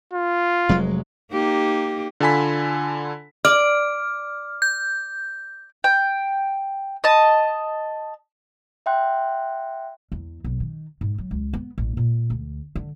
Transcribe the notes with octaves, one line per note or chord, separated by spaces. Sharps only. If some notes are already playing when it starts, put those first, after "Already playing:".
F4
F1 F#3 G#3
A#3 D#4 G4
D3 F4 A4 G#5 B5 B6
D5 F6
G6
G5
D#5 A5
E5 F#5 G5 C6 F#6
E2
B1
D#3
G#2
F#3
C#2
B3
A1
A#2
D2
D3